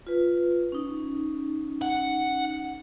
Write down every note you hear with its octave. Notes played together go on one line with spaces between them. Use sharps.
F4 B4
C#4 D#4
F#5